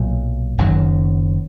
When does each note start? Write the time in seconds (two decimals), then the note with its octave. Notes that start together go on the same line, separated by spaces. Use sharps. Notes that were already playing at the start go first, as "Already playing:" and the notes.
Already playing: B1 A#2 F#3
0.58 F#1 F#2 D#3 F#3